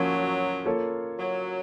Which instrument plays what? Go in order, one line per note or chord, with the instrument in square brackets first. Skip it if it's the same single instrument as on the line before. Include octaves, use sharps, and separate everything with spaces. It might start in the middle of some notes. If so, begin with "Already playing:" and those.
Already playing: [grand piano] F3 A#3 C#4 [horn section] F#3
[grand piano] A#3 F4 A4 C#5
[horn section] F#3